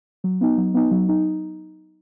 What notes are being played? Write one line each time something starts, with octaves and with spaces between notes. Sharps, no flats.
F#3
B3 D#4
F#3
B3 D#4
F#3
D#4